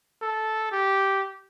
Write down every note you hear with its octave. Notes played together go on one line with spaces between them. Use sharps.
A4
G4